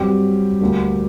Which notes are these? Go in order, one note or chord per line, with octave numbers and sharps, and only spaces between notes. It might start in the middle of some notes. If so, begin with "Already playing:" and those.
Already playing: G2 F#3 C4 G4
D2 D3 G3 A#3